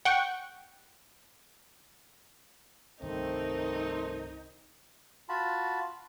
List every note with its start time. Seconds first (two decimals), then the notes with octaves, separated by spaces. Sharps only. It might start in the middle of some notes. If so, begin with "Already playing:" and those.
0.05 F#5 G5 C#6
3.02 C2 G2 D#3 A3 C4 D#4 A#4
5.29 F4 F#4 A5 B5